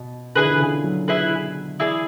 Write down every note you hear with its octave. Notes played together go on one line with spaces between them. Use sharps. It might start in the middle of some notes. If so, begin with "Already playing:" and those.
Already playing: B2
D3 E4 G#4 B4
E3
D3
C#3
F#3
E4 G#4 B4
E3 E4 G#4 D5